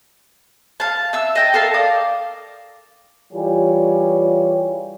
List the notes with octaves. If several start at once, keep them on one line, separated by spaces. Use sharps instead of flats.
F5 A5
E5 E6
D#5 G5 A5
A4 A#4 F5 A5
D5 F5 D#6
E3 G3 F4 G4 G#4 C#5